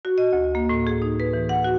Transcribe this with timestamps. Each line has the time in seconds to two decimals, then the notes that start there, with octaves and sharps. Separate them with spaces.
0.05 F#4
0.18 D#5
0.33 D2
0.55 A#3
0.69 A2
0.87 G#4
1.02 D#4
1.20 B4
1.34 E3
1.49 F#5
1.64 F#4